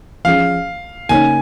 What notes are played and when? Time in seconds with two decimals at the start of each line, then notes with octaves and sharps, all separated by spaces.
0.24 F3 C#4 G#4 F5
1.09 C#3 A#3 D#4 C#5 G#5